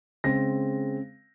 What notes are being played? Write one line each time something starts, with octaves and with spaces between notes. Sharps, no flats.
C#3 G#3 C4 A#6